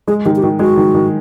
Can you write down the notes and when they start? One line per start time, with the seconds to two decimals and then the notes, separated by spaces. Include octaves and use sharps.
0.08 G#3 G#4
0.25 D#3 G4
0.36 G4
0.43 D#3 F#4
0.59 G#3 F#4
0.77 D#3
0.94 D#3